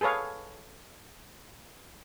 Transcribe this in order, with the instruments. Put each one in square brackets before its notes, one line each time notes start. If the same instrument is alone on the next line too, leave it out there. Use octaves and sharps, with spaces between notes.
[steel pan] G#4 A4 B4 C#5 F5